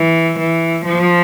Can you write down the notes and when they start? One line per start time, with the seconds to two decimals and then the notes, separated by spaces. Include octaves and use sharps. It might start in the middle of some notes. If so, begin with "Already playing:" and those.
Already playing: E3
0.38 E3
0.84 F3